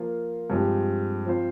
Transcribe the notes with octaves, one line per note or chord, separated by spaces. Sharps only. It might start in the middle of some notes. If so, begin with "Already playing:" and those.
Already playing: F3 A#3 F4
G2 F3 G#3 C4 G4
F3 C4 F4 C5